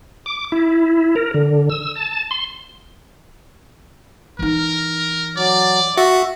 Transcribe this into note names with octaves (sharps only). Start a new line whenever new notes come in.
D6
E4
A#4
D3
E6
A5
C6
E3 D#4 A#4
F#3 D5
F#4 E5 C#6